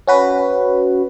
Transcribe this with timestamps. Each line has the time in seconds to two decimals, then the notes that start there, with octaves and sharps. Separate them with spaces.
0.08 C#4 F#4 B4